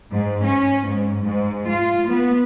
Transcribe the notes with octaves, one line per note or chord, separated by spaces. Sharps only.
G#2
C#4
G#2
G#2
F4
B3